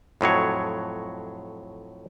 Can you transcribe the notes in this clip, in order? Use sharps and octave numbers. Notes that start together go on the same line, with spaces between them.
F2 A2 F#3 C#5